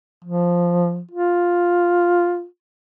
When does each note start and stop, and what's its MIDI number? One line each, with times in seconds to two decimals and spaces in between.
0.24 1.01 53
1.11 2.45 65